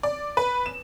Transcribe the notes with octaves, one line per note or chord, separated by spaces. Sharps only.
D5
B4
E7